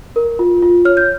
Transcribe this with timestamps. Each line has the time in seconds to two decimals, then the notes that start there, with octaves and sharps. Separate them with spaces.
0.16 A#4
0.39 F4
0.62 F4
0.85 C#5 F6
0.97 G6